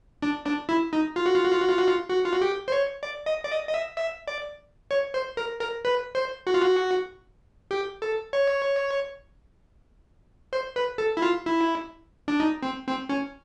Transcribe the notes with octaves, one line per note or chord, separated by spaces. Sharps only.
D4
D4
E4
D#4
F4
F#4
F4
F#4
F4
F#4
F4
F#4
F4
F#4
F4
F#4
G4
C5
C#5
D5
D#5
D5
D#5
D#5
E5
E5
D5
C#5
C5
A#4
A#4
B4
C5
F#4
F4
F#4
G4
A4
C#5
C5
B4
A4
E4
F4
E4
D4
D#4
C4
C4
C#4